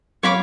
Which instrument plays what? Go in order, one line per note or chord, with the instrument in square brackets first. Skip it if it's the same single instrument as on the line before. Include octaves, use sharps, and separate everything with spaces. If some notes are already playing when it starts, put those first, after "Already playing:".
[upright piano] F#3 [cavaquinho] C#5 F5 B5 D6